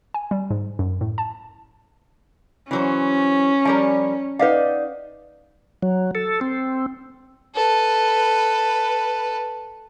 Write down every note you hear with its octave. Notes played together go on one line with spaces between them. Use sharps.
G#5
G3
G#2
F#2
A2
A5
E3 F#3 C#4 C5
F3 G3 A#4 G#5
D#4 B4 D5 F5 F#5
F#3
A4
C4
A4 B4